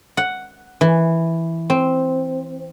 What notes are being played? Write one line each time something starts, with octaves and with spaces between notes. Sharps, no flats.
F#5
E3
C4